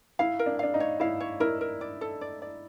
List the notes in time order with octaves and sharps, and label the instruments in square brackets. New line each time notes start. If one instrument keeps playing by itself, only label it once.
[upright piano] E4 [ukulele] F5
[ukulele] A#4
[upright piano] D4
[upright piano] D4 [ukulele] F5
[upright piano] D#4
[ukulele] C#5
[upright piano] E4 [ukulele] F5
[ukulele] C#5
[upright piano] E4 [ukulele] A#4
[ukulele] A#4
D5
A4
D5
D5